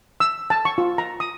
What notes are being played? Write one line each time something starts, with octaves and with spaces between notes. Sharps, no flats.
E6
A5
C#6
F4
A#5
D#6